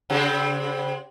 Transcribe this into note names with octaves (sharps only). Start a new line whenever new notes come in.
C#3 C4 G4